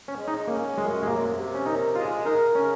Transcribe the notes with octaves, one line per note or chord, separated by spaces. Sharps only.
C#4
G#3
D#4
A#3 C#4
F#2 G#3
G#3
C3 A#3
C3
C#4
D#4 A#4
G#3 F4
D#4 A#4
C#3 C#4